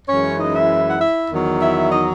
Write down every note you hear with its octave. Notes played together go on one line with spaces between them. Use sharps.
F#2 E3 G#3 C#4 C#5
D#4 D#5
E4 E5
F#5
E4 E5
E2 D#3 F#3
E4 E5
D#4 D#5